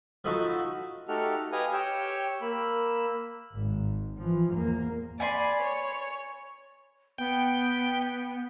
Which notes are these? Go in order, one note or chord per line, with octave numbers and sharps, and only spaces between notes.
F3 A3 D#4 E4 F#4 A5
A3 D#4 F#4 G4 A4 F6
G4 B4 D#5 F5 G#5
G4 C#5 G5 E6
A#3 B5 E6
G#1 G#2
E3 F3
E2 A#3
D5 G#5 B5 C6
C#5
B3 G5